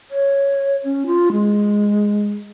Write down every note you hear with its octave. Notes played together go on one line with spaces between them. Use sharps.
C#5
C#4
F4
G#3